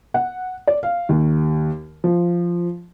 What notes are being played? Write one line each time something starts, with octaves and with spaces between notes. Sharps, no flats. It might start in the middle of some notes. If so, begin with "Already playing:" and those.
F#5
D5
F5
D#2
F3